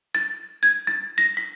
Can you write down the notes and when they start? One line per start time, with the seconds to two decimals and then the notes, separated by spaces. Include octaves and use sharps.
0.15 A6
0.63 G#6
0.87 A6
1.18 A#6
1.37 B6